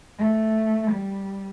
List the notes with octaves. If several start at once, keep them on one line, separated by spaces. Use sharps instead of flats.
A3
G3